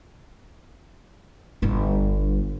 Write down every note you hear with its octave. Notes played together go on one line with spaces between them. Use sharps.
G1 G2